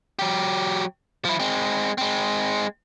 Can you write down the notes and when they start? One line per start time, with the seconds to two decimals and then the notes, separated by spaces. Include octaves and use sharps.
0.19 F#3 G4
1.25 F3 E4
1.40 G#3 C4
1.98 G#3 C4